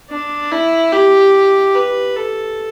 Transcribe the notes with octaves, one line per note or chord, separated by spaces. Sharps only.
D4
E4
G4
B4
A4